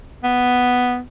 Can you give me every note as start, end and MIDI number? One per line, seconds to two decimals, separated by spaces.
0.24 0.99 59